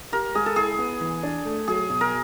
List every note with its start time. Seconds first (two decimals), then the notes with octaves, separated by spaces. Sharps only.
0.12 G4 A#4
0.35 G#3 G#4
0.46 A4
0.56 E4 G#4
0.79 B3
1.01 E3
1.23 D4
1.45 A3
1.68 F#3 G#4
1.90 B2
2.01 A#4